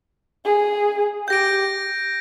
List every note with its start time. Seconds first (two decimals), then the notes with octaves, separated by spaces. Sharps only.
0.45 G#4
1.28 G4 G6 A#6 D7